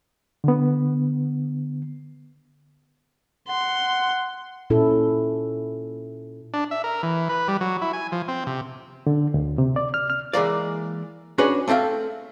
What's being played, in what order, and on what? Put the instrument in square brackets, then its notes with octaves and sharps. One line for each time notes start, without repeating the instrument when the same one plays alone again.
[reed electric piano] D3 B3
[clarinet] F#5 [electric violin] C6
[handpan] A#2 C#4 E4 A4
[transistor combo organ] D4
E5
A#4
E3
B4
G3
F#3
E4
G#5
F3
C4
C3
[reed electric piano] D3
D2
C3
D5
F6
F6
[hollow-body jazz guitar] E3 G#3 A#3 D5
C#4 D4 F#4 G#4 B4 C#5
A3 C4 A4 E5 F5